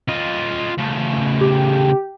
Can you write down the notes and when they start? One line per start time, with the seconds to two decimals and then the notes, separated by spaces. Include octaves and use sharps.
0.09 F4 D#5
0.78 C#3 A3
1.41 G4